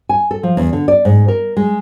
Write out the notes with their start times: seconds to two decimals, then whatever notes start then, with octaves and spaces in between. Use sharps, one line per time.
0.09 G#5
0.31 A4
0.43 F3
0.57 E2
0.73 D3
0.88 D5
1.05 G#2
1.28 A#4
1.57 G#3